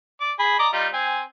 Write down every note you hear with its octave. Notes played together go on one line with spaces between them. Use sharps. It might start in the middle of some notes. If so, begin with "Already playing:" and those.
D5
G#4 B5
D5 D#5 A#5
G3 D#4 F4
C4 G#5